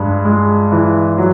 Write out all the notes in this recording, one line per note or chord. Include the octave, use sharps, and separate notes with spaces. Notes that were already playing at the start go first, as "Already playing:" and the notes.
Already playing: G2 G#3
G#3
E3
F#3